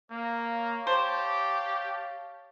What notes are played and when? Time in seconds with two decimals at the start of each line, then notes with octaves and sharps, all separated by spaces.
0.11 A#3 C#5 F5
0.87 G4 C5 A5